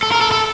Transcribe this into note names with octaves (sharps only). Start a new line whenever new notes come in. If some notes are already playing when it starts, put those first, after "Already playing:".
A4
A#4
A4
A4